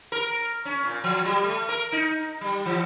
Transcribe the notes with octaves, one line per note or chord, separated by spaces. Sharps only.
A#4
C#4
A#2
F3
G3
A3
A#4
D#4
G3
E3